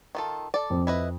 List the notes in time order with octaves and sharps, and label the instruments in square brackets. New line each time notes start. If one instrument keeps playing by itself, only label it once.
[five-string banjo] D#3 F4 A4
A4 D5
[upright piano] F2
[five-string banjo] E4 B4 D#5